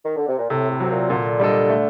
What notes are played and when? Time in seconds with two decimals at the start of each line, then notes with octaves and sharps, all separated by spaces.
0.05 D#3
0.17 D3
0.28 C3
0.39 A#2
0.50 A2 C3
0.70 A2
0.80 F#3 C4
0.90 A#2
1.10 A#2 D3
1.40 G3 D4 A4 D#5
1.70 A3